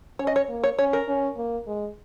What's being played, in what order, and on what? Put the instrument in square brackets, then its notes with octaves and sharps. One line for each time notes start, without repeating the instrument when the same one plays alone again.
[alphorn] C#4 [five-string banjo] C#5
[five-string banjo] D#5
C#5
[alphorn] A#3
[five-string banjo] C#5
[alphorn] C#4 [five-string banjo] C#5
[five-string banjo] A#4
[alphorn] C#4
A#3
G#3